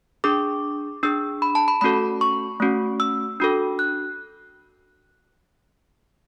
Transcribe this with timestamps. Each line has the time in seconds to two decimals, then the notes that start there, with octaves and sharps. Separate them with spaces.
0.24 D4 G#4 D6
1.03 D4 G#4 E6
1.42 B5
1.55 A5
1.68 B5
1.81 A3 C#4 F#4 A4 B5
2.21 C#6
2.60 A3 C#4 F#4
3.00 E6
3.40 D4 F#4 A4
3.79 F#6